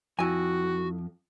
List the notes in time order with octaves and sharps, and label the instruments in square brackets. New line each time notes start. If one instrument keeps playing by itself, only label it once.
[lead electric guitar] F2 [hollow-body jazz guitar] E4 G#5 [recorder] F#4